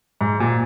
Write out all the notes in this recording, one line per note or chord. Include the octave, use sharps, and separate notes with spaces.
G#2
A#2